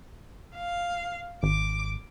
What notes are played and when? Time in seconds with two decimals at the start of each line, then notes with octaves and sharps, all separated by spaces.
0.54 F5
1.43 G#1 D6